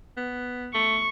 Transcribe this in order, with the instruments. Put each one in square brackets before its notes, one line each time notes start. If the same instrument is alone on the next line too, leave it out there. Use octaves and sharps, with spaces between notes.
[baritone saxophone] B3
[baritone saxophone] A3 [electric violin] C#6